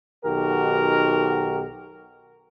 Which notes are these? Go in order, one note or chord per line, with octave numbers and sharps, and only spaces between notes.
B1 D#3 F#4 G4 A#4